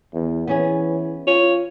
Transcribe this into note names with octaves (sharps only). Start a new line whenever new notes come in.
E2
E3 B3 C#4 G#4
F4 C#5